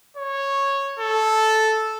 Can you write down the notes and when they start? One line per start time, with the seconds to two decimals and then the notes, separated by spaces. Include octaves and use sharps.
0.17 C#5
0.99 A4